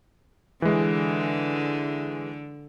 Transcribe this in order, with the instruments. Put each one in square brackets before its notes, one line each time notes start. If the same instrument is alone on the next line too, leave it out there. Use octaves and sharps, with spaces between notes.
[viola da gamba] D3 [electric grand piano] E3 G#3